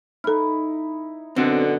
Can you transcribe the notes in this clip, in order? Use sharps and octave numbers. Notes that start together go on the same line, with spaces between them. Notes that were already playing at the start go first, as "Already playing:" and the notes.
D#4 E4 A4 F6
F#2 B2 D3 C4